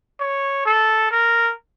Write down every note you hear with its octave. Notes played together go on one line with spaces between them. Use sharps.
C#5
A4
A#4